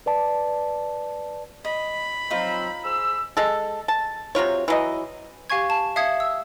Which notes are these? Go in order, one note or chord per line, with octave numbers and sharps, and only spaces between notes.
B4 D5 A5
D#5 B5
F3 F#3 C4 D#4 F4
G#4 C5 E6
G#3 A4
A5
C3 F#3 F4 C#5
E3 F#3 D#5
G4 F5 G#5 C#6 G#6
A5
E5 F5 D#6 G#6 C#7
E6